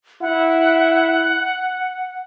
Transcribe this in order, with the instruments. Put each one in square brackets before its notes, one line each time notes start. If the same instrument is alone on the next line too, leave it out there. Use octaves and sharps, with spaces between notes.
[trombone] E4 [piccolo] F#5